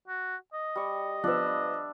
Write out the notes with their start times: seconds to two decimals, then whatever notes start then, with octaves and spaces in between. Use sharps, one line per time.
0.08 F#4
0.53 D#5
0.76 G3 C#6
1.24 F3 B3 D4 E5